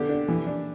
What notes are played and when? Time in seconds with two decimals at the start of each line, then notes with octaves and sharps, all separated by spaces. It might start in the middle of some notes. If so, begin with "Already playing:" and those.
Already playing: D3 B3 G4
0.09 D4
0.28 E3
0.46 D4